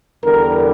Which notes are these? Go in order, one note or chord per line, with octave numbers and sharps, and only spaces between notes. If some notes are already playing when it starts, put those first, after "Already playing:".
E2 D3 G3 A#4